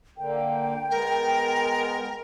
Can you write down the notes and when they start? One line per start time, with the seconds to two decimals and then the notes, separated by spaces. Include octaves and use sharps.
0.18 D3 A#3 G5
0.91 G#3 B3 A#4